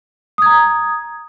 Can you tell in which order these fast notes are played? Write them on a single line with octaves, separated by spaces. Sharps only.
D#6 G#6 A#5